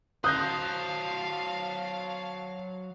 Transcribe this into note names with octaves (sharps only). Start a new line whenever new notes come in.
F#3 C5 F5 A5 D#6 F#6 G6 A#6